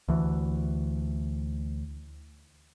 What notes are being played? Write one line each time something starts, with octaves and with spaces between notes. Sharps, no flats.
D2 E3